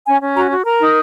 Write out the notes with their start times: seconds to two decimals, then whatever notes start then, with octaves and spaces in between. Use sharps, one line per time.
0.06 C#4 G#5
0.21 C#4
0.36 F#4 A#5
0.51 F#4
0.66 A#4 A#5
0.81 D#4